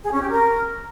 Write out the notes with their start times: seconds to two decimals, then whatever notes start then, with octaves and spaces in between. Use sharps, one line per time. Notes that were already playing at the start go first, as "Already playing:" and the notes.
0.03 G#4
0.12 C#4
0.21 G4
0.30 A#4